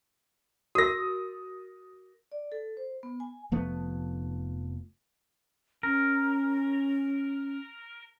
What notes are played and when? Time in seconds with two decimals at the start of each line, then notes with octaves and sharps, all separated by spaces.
0.75 F#4 A#4 D#6 A#6
2.32 D5
2.52 A4
2.77 C5
3.03 B3
3.20 G#5
3.52 F1 F3 A3 B3
5.83 C#4 A#4